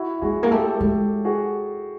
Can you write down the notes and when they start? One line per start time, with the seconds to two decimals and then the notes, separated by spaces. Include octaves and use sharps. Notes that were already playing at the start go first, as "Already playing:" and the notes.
Already playing: E4 F#4
0.22 G#3 F#4 G#4
0.43 A#3 G#4
0.51 A3 G4 A4
0.81 G#3 G4 A4
1.25 F#4 G#4